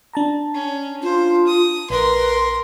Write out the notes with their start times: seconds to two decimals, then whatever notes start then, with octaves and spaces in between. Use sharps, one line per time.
0.13 D4 A5 A#5
0.55 C#4
1.03 F4 C5
1.47 D#6
1.90 A#1 A#4 B4 C6